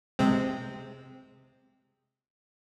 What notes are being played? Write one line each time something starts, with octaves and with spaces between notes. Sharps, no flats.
C3 G#3 C4